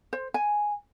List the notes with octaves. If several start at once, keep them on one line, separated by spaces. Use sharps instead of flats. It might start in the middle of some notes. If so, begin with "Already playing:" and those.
C5
G#5